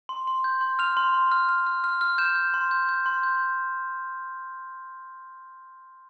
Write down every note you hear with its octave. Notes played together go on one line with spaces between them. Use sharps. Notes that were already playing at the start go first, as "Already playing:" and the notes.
C6
C6
G6
C6
F6 F7
C6
C6
F6
F6
F6
F6
F6
G6 E7
G6
C6
G6
G6
C6
G6